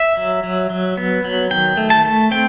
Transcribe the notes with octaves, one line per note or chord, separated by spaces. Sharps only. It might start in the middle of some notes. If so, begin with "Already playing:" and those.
Already playing: E5
F#3
F#3
F#3
B3
F#3
D#3 G5
A3
A5
A3
C4 G5